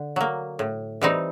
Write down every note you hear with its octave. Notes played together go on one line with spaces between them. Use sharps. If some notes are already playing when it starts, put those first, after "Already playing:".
Already playing: D3
F#3 A#3
A2
E3 G3 C4 D#4